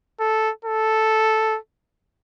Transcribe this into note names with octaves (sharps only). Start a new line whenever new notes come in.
A4
A4